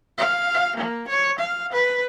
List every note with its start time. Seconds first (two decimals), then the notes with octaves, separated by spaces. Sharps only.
0.18 F5
0.76 A#3
1.08 C#5
1.39 F5
1.73 B4